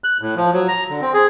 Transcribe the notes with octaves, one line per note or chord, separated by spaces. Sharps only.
F#6
A2
F3
F#3
A#5
D3
C4
G#4